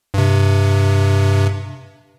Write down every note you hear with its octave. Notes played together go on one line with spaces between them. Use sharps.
G2 C3